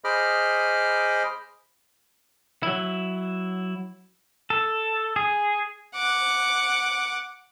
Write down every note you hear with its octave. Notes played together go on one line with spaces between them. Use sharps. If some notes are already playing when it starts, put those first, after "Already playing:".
G#4 C5 D#5 B5 D6 F6
F#3 E4
A4
G#4
F#5 D6